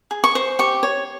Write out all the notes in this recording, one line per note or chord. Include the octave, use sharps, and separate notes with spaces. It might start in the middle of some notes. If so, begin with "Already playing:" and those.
G#4
C#6
C5
G4 C#6
C#5